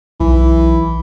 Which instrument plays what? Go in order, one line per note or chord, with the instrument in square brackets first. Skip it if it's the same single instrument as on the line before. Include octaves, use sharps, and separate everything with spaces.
[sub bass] B1 [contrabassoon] E3